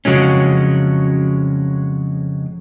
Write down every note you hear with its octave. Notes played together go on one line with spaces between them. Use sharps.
F2 C#3 F#3 G#3 C#4